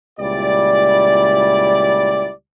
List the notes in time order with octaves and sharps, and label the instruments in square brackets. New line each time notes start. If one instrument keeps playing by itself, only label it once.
[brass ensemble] C#2 A#2 G3 E4 D5